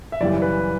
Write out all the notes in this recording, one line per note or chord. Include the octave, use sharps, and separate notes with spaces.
E5
F#2 C#3 E3 G3 D5
B4